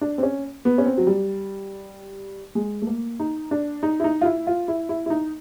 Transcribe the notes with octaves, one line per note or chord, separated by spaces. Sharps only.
D4
C4
C#4
B3
C#4
C4
F#3
G3
G#3
A3
A#3
D#4
D4
D#4
E4
D#4
F4
E4
F4
E4
E4
E4
D#4